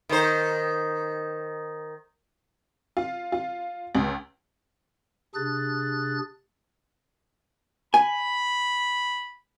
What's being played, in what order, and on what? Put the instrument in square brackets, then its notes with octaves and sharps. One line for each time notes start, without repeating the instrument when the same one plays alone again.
[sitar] D#3 C5
[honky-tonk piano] F4
F4
C#2
[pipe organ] C3 D4 G#4 F#6 A6
[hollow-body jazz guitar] G#5 [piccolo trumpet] B5